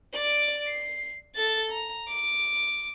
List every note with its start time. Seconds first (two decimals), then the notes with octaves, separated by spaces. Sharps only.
0.14 D5 D6
0.68 C7
1.35 A4 A6
1.72 A#5
2.08 D6